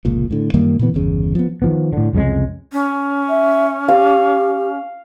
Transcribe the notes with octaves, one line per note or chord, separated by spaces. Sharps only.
F1 C#2 A#2
A2 D3
F#2 D#3 G3 A#3
A#2 D3 E3 B3
G1 E2 C#3
F3 B3
D#3 F3 B3
A2 D3
C2 F2 C#3 G#3
C#4
E5
G4 F5